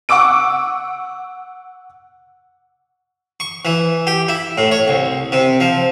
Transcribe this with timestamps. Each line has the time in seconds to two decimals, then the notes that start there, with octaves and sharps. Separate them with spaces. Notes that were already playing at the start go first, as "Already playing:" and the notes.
0.09 F#5 C#6 D6 E6 D7
3.40 C#6
3.65 E3
4.07 G4
4.28 E4
4.58 A2
4.72 C#5
4.88 C2
5.32 C3
5.60 F3